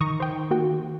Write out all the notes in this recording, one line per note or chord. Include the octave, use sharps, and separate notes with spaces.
D#3 A#5 C#6 D#6
C5 G5
A#3 F#4 G5